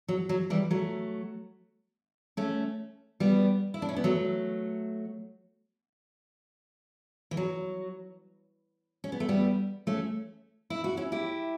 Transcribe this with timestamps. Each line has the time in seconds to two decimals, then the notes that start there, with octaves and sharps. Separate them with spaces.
0.08 F#3
0.29 F#3
0.50 E3 G3
0.71 F#3 A3
2.37 A3 C#4
3.20 G3 B3
3.74 E4
3.82 D4
3.89 C#4
3.97 B3
4.04 F#3 A3
7.31 E3
7.37 F#3
9.04 C#4
9.12 B3
9.20 A3
9.29 G3 B3
9.87 A3 C#4
10.70 E4
10.84 F#4
10.97 C#4 E4
11.12 E4 G4